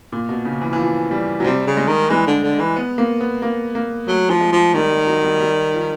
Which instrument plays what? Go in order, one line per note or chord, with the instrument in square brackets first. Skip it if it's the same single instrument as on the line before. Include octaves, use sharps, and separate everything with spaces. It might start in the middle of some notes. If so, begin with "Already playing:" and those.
[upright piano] A#2
B2
C#3
E3
E3
F3
G3
F#3
[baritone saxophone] C3 [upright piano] G3
[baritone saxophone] C#3
[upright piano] G#3
[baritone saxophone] D#3
[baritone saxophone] E3 [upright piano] G#3
[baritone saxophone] D3
D3
E3
[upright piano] B3
A#3
B3
A#3
A#3
[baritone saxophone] F#3 [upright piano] A3
[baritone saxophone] F3
[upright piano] G#3
[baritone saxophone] F3
[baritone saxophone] D#3 [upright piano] G3
[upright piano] G3
F#3
G3
G3
F3